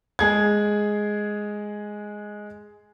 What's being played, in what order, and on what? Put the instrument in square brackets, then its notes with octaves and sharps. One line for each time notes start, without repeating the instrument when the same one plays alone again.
[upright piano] G#3 G#4 G#6